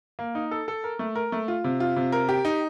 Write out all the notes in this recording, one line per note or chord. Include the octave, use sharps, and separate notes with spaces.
A#3
D#4
A4
A4
A#4
A3
A#4
A3
F4
C3
F4
C3
A#4
G4
D#4